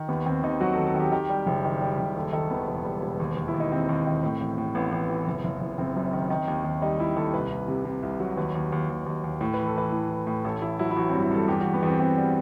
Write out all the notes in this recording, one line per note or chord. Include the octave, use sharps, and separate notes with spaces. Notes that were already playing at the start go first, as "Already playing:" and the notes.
Already playing: D#3
D#2 B3
D#2 C4
D#2 D#4
F#3 F#4
D#2 A4
A4
D#3 G4
D#3 G4
G3
F#1
D#3
G3
F#1
D#2 A4
D#3 A4
D#2 B3
E1
G3
E1
D#2
D#2
E4
D#2
D#4
D#2 C4
D#2
D#3
A2
A1
A2
A1 B3
A1
E3
F#1
F#1
F#1
F#1 C4
F#2
D#3
D#3
D#2
D#2
G3 D#4
G3 E4
D#2 A4
C2 B4
C2
C3
C3
C2
F#3
D#2 B4
D#2
D#2
D#2
D#2
D#2
A2
E3 B4
A4
E3 B4
A2
E3
A2
A1 A4
A1 E4
F#3 E4
E4
A1 F#4
G2 C4
E4
G2 A4
E2 G4
E2 F#4
B3
E2 C4
E2 C4
G3